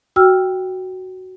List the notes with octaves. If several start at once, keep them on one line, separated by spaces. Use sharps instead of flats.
F#4 G5 E6 F6